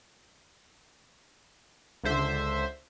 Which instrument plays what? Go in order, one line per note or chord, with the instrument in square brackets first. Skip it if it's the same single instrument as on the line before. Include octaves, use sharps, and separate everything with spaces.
[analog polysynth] C#2 D3 C5 E5